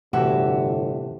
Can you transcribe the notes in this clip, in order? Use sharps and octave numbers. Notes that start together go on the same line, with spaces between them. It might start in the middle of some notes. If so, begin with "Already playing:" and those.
G1 A2 C3 E3 F#4 G4 E5